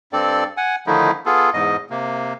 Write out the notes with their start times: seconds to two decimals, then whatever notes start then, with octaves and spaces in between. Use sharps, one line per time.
0.13 G2 C4 A4 D5
0.57 F#5 G#5
0.87 D3 D#3 F3 A3 D#4 E4
1.26 B3 F4 G#4 A4
1.54 E2 G#2 D#5
1.90 C3 A#3